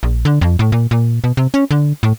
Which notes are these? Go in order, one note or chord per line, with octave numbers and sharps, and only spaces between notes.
A#1
D3
F2
A2
A#2
A#2
B2
C3
C#4
D3
A2